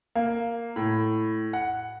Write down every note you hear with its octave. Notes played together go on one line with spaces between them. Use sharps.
A#3
A2
F#5